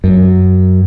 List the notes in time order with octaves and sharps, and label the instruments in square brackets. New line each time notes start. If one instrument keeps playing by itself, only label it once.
[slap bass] F#2